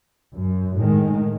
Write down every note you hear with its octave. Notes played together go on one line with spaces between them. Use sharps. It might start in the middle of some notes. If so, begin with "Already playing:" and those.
F#2
A2 D#3 G#3